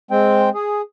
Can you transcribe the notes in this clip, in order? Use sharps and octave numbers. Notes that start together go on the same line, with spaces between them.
G#3 C4 G5
G#4